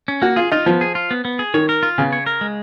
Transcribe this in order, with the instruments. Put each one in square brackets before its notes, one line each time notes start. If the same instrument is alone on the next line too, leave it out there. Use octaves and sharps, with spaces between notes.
[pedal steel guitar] C#4
[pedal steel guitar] A#3 [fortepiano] F#4
[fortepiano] F4 [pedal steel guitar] G#4
[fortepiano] D#4 [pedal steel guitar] F4
[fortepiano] F3 [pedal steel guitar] B3
[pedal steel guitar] G#4
F4
B3
B3
G#4
[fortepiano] D#3 [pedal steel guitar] C#5
[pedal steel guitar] A#4
F4
[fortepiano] C#3 [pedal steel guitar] B3
[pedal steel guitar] C#5
A#4
G#3